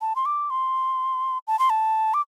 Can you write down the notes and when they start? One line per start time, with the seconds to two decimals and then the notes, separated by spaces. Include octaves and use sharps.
0.01 A5
0.16 C6
0.26 D6
0.50 C6
1.47 A5
1.59 C6
1.70 A5
2.14 D6